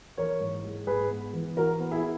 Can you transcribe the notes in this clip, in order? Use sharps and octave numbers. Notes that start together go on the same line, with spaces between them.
E3 A#4 C#5
G#2
G#3
G#2 G#4 B4
B3
E3
E3 F#4 A#4
B3
E4 G#4